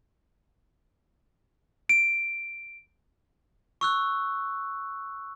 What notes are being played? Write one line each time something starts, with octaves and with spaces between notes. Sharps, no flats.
D7
C#6 E6 F#6